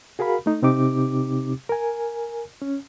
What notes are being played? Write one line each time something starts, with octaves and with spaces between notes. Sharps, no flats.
F#4 G#4 A#4 F5 B5
A3 D#4
C3 C4 D#4 G4 D6
A#4 G#5
C#4